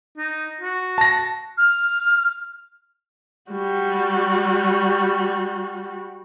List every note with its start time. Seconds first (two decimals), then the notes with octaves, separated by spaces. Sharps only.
0.18 D#4
0.61 F#4
0.98 A5 A#6
1.58 F6
3.51 G3 F#4